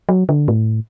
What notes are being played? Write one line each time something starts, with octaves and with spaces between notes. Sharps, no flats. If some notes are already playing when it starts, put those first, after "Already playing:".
F#3
D3
A2